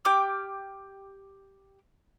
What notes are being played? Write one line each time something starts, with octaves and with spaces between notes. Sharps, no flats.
G4 G5 D6 F6